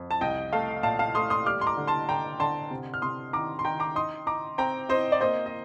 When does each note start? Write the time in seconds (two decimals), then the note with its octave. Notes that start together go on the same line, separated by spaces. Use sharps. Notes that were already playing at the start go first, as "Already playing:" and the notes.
Already playing: F2
0.11 A5
0.21 C2 D#5 G5
0.52 A3 F5 A5
0.83 A#2 F5 A5
0.99 F5 A5
1.15 A3 C6 D#6
1.30 C6 D#6
1.46 G3 D6 F6
1.61 C6
1.67 A#5 D6
1.77 D3
1.87 A5 C6
2.09 D3 G5 A#5
2.40 D3 A5 C6
2.71 C3
2.94 F6
3.02 C3 C6 D#6
3.33 D#3 A#5 D6
3.59 C6
3.65 D#3 G5 A#5
3.80 A#5 D6
3.95 D#4 C6 D#6
4.27 D#4 A#5 D6
4.58 C4 G5 A#5
4.89 C4 C5 D#5
5.12 D5
5.21 A#3 C5 D#5
5.46 D#5